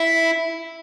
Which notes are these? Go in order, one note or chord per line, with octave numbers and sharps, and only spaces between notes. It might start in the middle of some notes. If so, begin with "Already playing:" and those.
Already playing: E4